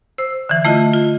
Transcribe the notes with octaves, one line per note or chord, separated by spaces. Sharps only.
C5 E6
D3 E3
A3 E4 F4 D#5
F4